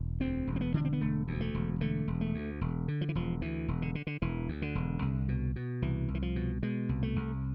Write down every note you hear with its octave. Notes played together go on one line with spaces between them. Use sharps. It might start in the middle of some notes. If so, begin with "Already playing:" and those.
Already playing: E1
D2 C4
E1
C4
B3
D3 D4
C4
B3
E1 A3
D2
A3
E1
D3 A3
E1
A3
D2
E1
D3
F3
E3
E1 F3
D2 E3
E1
D3
D3
D3
E1 E3
D2
D3
E1
C2
B2
B2
C2 E3
C2
E3
F3
B2
B2 G#3
C2
A3
C2